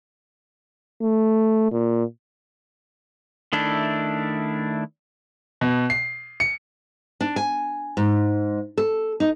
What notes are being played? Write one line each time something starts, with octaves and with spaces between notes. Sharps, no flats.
A3
A#2
D#3 A3 D4 E4
B2
C7
C#7
D4
G#5
G#2
A4
D#4